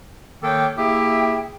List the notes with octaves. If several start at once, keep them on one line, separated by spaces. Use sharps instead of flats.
D#3 A#3 A4 C#5 G5 D6
A#3 E4 G4 G#4 E5 G5